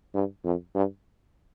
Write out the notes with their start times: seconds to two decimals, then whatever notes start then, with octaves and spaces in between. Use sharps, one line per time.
0.14 G2
0.45 F2
0.75 G2